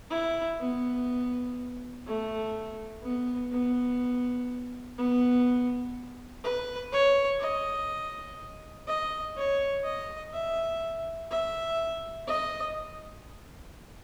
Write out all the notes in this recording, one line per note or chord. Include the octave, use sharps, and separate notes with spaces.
E4
B3
A3
B3
B3
B3
B4
C#5
D#5
D#5
C#5
D#5
E5
E5
D#5